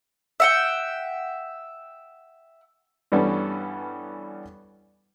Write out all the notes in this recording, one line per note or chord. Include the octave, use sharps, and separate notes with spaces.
E5 F#5 G5
G2 E3 G3 B3 C#4 A4